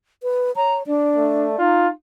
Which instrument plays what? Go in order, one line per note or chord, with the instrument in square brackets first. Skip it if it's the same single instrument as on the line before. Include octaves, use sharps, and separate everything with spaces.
[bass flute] B4
[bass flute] C#5 [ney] A#5
[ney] D4 [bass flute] D5
[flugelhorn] A3
[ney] D#4 [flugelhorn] F4